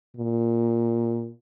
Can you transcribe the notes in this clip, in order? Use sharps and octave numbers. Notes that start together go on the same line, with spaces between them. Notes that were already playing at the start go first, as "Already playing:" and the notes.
A#2